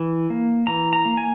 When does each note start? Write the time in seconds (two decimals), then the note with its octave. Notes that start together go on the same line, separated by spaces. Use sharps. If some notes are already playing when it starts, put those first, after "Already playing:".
Already playing: E3
0.30 A#3
0.67 E3 A#5
0.93 A#5
1.05 A#3
1.17 G#5